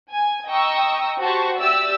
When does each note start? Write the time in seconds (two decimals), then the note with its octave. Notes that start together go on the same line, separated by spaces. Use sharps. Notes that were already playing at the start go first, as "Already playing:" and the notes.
0.11 G#5
0.48 D#5 G5 A#5 C#6 D#6 E6
1.20 F#4 G4 C5 A5 C#6
1.58 G4 D5 E5 E6